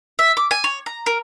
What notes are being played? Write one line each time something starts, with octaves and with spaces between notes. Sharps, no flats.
E5
D6
G#5
C#5
A#5
A#4